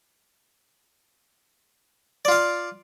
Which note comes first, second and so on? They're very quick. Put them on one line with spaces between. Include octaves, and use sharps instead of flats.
D5 F4 F5